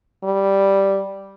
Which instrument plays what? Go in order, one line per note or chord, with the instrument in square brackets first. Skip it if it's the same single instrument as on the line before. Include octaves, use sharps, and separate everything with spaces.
[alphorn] G3